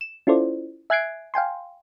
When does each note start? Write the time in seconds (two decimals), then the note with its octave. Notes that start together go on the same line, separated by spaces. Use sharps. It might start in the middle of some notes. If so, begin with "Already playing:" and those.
0.01 E7
0.27 C#4 E4 F4 A4 C5 D5
0.90 E5 G#5 F#6 G#6 C7 D7
1.34 F5 G5 G#5 C6